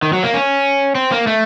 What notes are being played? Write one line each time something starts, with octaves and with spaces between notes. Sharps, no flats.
D#3
F#3
A#3
C#4
C4
A#3
A3